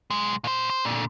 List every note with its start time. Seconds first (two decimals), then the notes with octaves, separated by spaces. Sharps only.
0.10 B1 G#3
0.44 A#2 C5
0.70 C5
0.85 A#2 D3